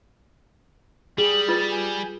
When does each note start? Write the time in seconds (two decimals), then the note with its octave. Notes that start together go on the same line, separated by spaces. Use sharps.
1.18 G3 G#4 F#7
1.49 F4 B4 A6
1.70 G#5